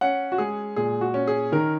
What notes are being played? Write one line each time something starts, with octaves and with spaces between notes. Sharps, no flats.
C#4 F#5
F#4
G#3 G#4
A#2 G#4
F#4
C#4
G#4
D#3 A#4